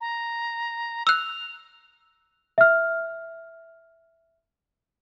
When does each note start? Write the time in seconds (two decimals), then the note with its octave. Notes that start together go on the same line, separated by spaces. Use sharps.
0.01 A#5
1.07 E6 F#6 F7
2.58 E5 F6